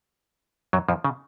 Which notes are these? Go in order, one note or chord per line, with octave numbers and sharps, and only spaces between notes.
F#2 F#3
F2 F3
C#3